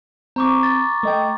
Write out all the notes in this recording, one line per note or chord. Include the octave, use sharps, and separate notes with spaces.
C4 A#5 C#6 D6
A6
A3 D#5 G5